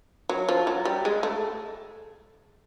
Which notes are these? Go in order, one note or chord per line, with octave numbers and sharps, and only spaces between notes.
F#3
F3
F#3
G3
G#3
A3